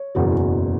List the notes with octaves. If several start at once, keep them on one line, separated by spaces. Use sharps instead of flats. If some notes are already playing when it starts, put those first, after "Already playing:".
Already playing: C#5
F#1 E2 B2 F#3